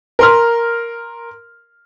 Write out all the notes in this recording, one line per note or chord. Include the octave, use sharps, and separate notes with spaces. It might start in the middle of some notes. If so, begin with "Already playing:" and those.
A#4 C6 F6